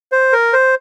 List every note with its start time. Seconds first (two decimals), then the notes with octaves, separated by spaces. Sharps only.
0.12 C5
0.33 A#4
0.53 C5